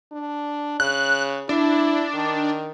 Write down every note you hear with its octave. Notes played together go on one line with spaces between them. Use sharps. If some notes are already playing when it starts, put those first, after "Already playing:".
D4
C#3 F#6
D4 E4
D#3